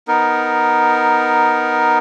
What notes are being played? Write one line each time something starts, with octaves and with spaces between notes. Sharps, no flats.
B3 D#4 A#4